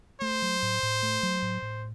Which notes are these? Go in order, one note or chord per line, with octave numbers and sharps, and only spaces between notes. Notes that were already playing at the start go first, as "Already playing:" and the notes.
A3 C5
F#3
A2
A2
A3
F#3
A2
A2